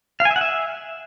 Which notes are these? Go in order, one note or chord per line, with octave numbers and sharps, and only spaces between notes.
F5
G#5
E5
F#5
E5